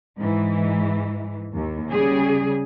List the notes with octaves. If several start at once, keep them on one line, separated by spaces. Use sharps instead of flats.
G#2 E3
D#2
C#3 G3 G#4